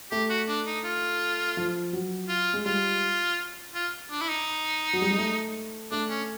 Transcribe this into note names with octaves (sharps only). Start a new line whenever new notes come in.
A3 G4
F#4
D4
D#4
F4
F3
F#3
F4
G#3
G3 F4
F4
D4
E4
D#4
F#3
G3
G#3
A3
A3 D4
C#4